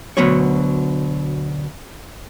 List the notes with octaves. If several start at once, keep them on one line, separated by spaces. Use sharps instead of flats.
D2 B2 F#3 C#5